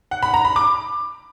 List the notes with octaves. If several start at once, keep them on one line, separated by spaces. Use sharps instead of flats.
F#5
B5
A#5
B5
D6